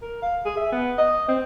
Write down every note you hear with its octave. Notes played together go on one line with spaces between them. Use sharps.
A#4
F5
G#4
E5
B3
D#5
C4